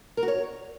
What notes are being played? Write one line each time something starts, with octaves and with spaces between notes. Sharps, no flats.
A#4
F#4
C#5